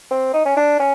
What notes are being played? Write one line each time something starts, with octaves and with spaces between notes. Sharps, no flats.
C4
D#4
C#4
D4
C#4